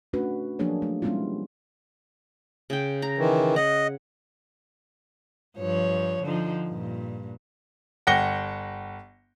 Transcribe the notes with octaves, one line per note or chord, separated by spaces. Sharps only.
A3 C#4 D4 F#4 B4
F3 F#3 A#3 D4 G#4 C#5
A3
G3 G#3 B3 C#4 E4 F4
C#3 G5
A#5
D#3 E3
D#5 F#5
G2 F3 C#5
D3 F3 D#4
G2 A#2
G1 F#5 G5 A#6 C#7 G7